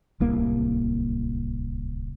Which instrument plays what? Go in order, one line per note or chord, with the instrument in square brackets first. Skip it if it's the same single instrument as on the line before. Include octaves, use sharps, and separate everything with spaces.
[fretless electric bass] D1 C2 A#3